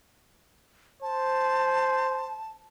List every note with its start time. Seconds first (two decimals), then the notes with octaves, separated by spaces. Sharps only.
1.02 C5 A5